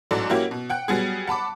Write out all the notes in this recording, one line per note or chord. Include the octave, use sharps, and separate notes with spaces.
A1 G#2 F#3 A4 D5
F#3 A#3 C#4 E4 F#4 G4
B2
F#5 G5 F#6
F#3 G3 B3 G#4
F#5 A5 B5 D6